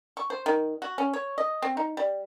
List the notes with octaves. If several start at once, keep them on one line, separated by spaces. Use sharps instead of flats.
C#6
C5
D#3
F#4
C#4
C#5
D#5
C4
D#4
G3